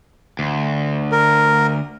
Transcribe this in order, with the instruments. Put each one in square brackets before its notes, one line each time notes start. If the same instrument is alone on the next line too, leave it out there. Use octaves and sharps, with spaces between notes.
[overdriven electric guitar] D2
[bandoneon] A#4